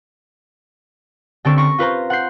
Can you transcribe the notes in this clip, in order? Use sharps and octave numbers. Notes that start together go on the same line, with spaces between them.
D3 C4 A4 C#6 D7
B5 C#6 A#6
F4 B4 C5 A#5
F#5 C6 G6 C7